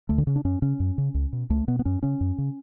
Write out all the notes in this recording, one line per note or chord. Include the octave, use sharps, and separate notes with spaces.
D2 A3
D3
C#3
D4
F#2 C#4
C#3 C#4
F#2
C#3
C#2
B2
C#2 A3
B2 B3
B3
F#2 C#4
C#3 C#4
F#2
C#3